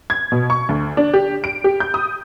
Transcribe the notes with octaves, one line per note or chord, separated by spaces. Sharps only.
G#6
B2
C#6
D2
D4
G4
D7
G4
G6
D#6